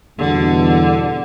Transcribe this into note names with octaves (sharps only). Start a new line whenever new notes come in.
E2 G2 B2 D3